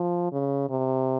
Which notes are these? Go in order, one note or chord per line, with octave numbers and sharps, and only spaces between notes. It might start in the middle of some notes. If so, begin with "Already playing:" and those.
Already playing: F3
C#3
C3